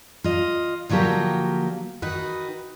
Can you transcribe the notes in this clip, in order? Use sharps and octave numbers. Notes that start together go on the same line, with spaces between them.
F4 D#5
D3 F3 F#3 A#3 G4
D#3 D#4 F#4 B4